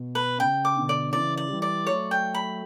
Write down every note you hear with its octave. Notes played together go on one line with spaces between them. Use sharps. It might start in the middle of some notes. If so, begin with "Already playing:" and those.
Already playing: B2
B4
C#3 G5
D6
B2 D3
D5
C#3 E3 D5
D5
E3 G3
D5
F#3 A3 C#5
G5
B5